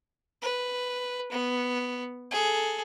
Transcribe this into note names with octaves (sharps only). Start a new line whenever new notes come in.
B4
B3
G#4 A4